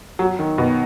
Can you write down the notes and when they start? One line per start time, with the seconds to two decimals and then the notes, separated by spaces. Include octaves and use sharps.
0.19 F#3
0.39 D#3
0.58 B2